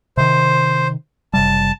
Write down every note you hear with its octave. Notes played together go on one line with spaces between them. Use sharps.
C3 D#3 C5
F#1 C3 G3 A5